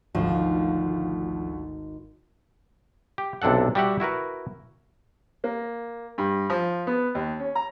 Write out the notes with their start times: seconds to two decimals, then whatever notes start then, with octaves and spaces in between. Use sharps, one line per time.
0.15 G#1 D2 F3 F5
3.18 G4
3.42 B1 C3 D4 A4 F#5
3.75 G3 F#4 G4 E5 F#5
4.00 E4 F#4 A#4 B4
5.44 A#3
6.18 G2
6.50 F3
6.87 B3
7.15 D#2
7.40 C#4
7.55 A#5